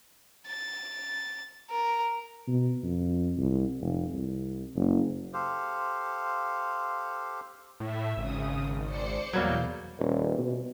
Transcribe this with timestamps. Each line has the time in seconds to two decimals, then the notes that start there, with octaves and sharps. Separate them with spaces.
0.47 A6
1.71 A#4
2.48 B2
2.83 F2
3.37 C2
3.80 F1
4.13 C2
4.75 F#1
5.33 G4 A4 C5 F5
7.80 A2 E5
8.17 G#1 C#3 D#6
8.85 C5 D5 C#7
9.33 E2 B2 F#3 G3 A#3 G6
9.99 D#1
10.39 B2